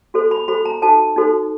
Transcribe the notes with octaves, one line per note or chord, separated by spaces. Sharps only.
F#4 A4 C5
B5
F#4 A4 C5 B5
A#5
D#4 F#4 A4 C5 A5
D#4 F#4 A4 C5